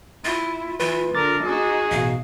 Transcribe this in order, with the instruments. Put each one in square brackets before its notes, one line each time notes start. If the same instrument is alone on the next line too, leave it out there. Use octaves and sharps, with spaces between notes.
[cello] E4 [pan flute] F4
[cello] E3 [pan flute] F4 [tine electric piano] B4
[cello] D3 [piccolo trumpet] A#4 [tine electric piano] D6 A6
[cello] D#4 F#4 [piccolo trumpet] G#4
[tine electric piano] A1 B2 [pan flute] F5